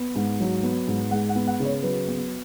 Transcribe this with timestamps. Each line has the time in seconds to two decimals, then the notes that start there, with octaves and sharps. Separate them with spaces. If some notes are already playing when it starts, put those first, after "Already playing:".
Already playing: B3
0.15 G#2
0.40 F#3
0.63 B3
0.88 G#2
1.11 G#3 F#5
1.29 F#5
1.35 B3
1.47 F#5
1.60 C#3
1.65 C#5
1.83 F#3 B4
2.08 B3